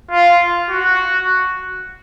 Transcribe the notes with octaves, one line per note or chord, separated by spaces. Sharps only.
F4
F#4